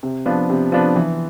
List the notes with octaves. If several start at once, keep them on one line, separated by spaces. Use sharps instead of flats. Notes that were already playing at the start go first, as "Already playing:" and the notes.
C3
F3 B3 D4
C3
F3 B3 D4
E3